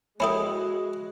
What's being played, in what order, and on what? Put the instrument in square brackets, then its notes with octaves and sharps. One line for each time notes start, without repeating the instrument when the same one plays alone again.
[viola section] G#3 F#4 [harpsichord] C#4 E4 G4 [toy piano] A4 B5